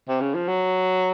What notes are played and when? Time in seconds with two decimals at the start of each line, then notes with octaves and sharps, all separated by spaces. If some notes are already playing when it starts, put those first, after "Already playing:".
0.08 C3
0.21 C#3
0.35 F3
0.48 F#3